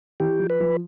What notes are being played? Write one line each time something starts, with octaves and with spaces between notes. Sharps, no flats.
E3 G4
F3
B4
F3